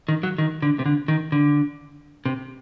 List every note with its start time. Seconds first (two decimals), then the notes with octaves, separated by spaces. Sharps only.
0.08 D#3
0.23 F#3
0.38 D#3
0.62 D3
0.79 C3
0.86 D3
1.08 D#3
1.32 D3
2.26 C3